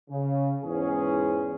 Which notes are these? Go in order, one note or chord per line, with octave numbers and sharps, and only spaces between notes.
C#3
E2 G#2 C#4 G#4